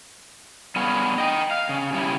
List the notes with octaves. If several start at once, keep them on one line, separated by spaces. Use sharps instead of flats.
G3 B3 C#4 G#4 F5
D#5 G5
F5
C#3
C#3 G3 C#4 E4